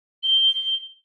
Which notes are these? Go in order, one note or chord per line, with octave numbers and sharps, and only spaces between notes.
G7